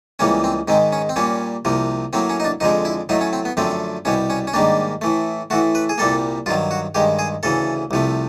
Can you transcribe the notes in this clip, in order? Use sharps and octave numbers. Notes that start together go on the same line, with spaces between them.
C#2 C#3 E3 G3 A#3 C#4
C4
G#2 D#3 G#3 C4
C#4
C4
A#2 G3 A#3 C#4
C2 C3 F3 A#3
A2 F#3 A#3 C4
C#4
D#4
D4
F2 D3 F3 G#3 D#4
E4
A2 F#3 A3 D#4
C#4
C4
B3
F#2 D3 F3 A3 C4
C2 B2 G3 C#4
C#4
C#4
G#2 D#3 G3 A#3 D4
A2 E3 A3
A2 E3 A3 F#4
B4
G#4
C2 A#2 G3 A#3 A4
G2 D#3 F#3 F4
F#4
G2 D#3 G#3 G4
G#4
D2 C#3 E3 A4
C2 C3 F3 A3